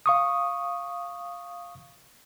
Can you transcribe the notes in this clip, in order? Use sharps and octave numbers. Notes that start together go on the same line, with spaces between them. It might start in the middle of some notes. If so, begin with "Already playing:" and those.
F5 C#6 D#6